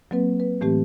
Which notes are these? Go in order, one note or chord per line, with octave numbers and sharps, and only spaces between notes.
F#3 A#3 C4 B4
B4
A2 E3 A3 C4 G4